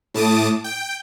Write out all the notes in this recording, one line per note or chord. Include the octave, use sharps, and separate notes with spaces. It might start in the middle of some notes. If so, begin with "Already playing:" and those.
A2 A5 D6 D#6
G5